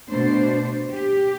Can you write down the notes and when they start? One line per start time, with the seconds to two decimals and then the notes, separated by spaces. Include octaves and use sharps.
0.11 B2 A3 D4 C5
0.91 G4